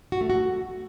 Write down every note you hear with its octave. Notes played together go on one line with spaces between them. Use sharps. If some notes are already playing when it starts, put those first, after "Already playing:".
F#4
A3
F#4